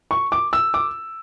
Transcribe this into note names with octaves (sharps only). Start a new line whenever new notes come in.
C#6
D6
E6
D6